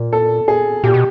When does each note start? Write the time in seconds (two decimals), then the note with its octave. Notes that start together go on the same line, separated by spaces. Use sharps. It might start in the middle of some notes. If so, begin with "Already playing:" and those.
Already playing: A#2
0.13 A4
0.48 G#4
0.84 A#2 G4
0.94 B2